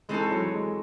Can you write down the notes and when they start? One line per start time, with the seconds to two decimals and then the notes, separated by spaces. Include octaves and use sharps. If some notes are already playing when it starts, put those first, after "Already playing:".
0.09 E3 G#3 A3 C4 D#4 A4
0.32 F#3
0.55 G#3